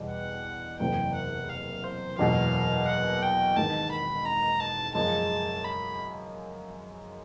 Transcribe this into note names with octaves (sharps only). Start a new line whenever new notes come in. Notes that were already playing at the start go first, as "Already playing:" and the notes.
Already playing: E2 B2 G3
F#5
F#1 E2 C3 G5
F#5
F5
C5
F#1 E2 B2 F#3 F5
F#5
G5
G#1 G#2 D#3 A5
B5
A#5
A5
F#2 C#3 F3 G#3 A5
B5